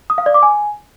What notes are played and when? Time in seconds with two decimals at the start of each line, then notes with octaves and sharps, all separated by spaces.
0.10 D#6
0.18 F5
0.26 D5
0.34 D6
0.43 G#5